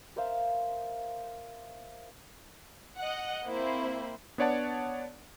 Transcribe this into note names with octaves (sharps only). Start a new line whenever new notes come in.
A#4 C5 E5 F5
D#5 F#5
A#3 C4 E4 C5
B3 D4 C#5 D5 F#5 A5